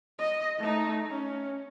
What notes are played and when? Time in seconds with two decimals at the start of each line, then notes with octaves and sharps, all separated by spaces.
0.19 D#5
0.58 A3 D#4
1.09 C#4